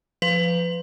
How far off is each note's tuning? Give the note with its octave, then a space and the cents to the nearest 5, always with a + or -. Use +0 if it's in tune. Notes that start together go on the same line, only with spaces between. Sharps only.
F3 +0 B4 +25